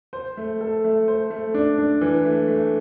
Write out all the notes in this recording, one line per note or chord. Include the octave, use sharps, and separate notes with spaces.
C5
A3
A4
A3
C5
A3
D4
D4
E3
A3
A3